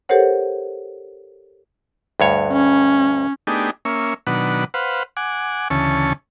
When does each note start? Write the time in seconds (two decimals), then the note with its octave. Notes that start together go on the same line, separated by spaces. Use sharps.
0.09 G4 A4 A#4 C5 C#5 F#5
2.20 D2 G2 C#5
2.53 C#4
3.47 A3 B3 D4 D#4 G4 G#4
3.85 A#3 C#4 E5 C#6
4.27 B2 D#3 F#3 D4 B4 F#5
4.74 B4 C5 F5 F#5
5.17 F#5 G#5 D6
5.70 D2 C#3 E3 C#4 A5 C#6